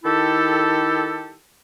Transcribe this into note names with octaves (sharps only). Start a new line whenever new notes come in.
D#3 E4 G4 A4